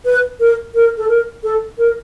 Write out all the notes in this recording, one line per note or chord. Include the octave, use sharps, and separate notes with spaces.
B4
A#4
A#4
A4
A#4
A4
A#4